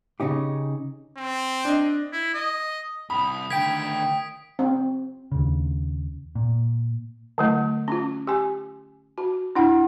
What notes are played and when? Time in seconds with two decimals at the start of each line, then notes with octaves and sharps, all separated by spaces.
0.20 C#3 C#4 D#4 G4
1.18 C4
1.65 D4 D#5
2.12 E4
2.34 D#5
3.10 C2 B5 D#6
3.50 D2 D#3 G5 G#6 B6 D7
4.59 C4
5.32 D#2 C#3
6.35 A#2
7.38 D3 F#3 A3
7.88 C#4 F4
8.27 G4 G#5
9.18 F#4
9.55 D4 E4 F#5